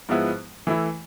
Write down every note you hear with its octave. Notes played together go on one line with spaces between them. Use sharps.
G#2 F3 G#3 B3 E4
E3 A3 E4